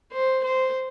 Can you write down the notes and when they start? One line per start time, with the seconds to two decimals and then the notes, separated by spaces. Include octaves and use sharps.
0.12 C5
0.44 C5